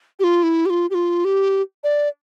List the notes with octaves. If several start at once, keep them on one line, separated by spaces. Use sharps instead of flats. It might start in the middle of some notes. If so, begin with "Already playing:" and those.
G4
F4
E4
G4
F4
G4
F4
G4
D5